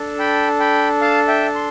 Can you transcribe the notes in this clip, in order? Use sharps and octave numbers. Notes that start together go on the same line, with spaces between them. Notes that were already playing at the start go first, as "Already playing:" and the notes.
Already playing: D4 A4
G5 B5
G5 B5
F5 A5
E5 G5
C6